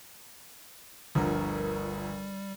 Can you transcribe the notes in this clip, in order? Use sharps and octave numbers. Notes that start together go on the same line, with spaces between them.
G1 D2 F3 G3 A#4